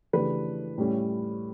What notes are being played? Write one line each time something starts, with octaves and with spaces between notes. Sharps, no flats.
C#3 E3 A3 D4 G4 B4
A2 G3 C#4 E4